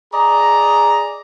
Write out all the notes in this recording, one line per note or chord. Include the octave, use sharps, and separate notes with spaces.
G#4 D5 D#5 A#5